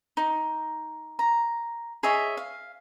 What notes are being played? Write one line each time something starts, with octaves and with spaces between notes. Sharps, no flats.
D#4
A#5
G#4 C#5 D#5 E5
F5